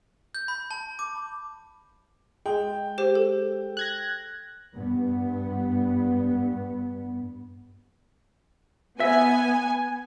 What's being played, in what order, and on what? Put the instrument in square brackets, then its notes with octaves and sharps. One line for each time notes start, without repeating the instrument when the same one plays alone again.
[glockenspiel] G6
B5
A5
D6
[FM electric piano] G#3 [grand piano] G5
[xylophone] G4 C5
A4
[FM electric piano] F#6 G#6 A#6
[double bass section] G2 B3
[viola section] B3 [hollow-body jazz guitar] E5 [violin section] G#5